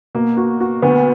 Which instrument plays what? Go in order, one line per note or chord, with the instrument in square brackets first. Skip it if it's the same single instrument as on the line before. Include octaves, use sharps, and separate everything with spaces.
[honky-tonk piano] B2 [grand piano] A#3
[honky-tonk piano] F#4
F#4
[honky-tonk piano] D2 [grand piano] B3